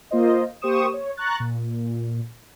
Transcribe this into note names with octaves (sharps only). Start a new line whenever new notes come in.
A#3 F4 C5 D#5
A#3 G4 C5 C#6 D#6 E7
C#5
A#5 C#6 F#6 A6
A#2